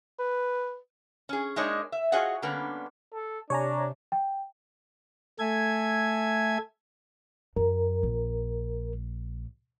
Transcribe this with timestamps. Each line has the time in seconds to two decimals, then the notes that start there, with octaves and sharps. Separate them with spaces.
0.19 B4
1.29 C#4 G#4
1.56 G#3 A#3 D4 D#4 C#5 D#5
1.92 E5
2.12 F4 F#4 G#4 C#5 D#5 F#5
2.42 D3 G3 A#3 B3 C#4
3.14 A4
3.50 C3 D4 C#5 G#5 A#5
4.12 G5
5.39 A3 A4 E5 G#5 G#6
7.56 F#2 A#4
8.03 A#1